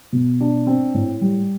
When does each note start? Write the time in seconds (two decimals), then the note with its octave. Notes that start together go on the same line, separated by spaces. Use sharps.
0.12 B2
0.41 D4
0.67 C4
0.94 A2
1.21 G3